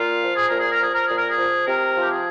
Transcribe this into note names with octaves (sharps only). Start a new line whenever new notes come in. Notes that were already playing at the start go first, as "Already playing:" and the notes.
Already playing: A#2 F4
F3
G#4
A#2 A#4
G#4
A#4
F3 G#4
A#4
A#2 G#4
A#4
G#4
F3
C3 A#4
F3
G4
G#4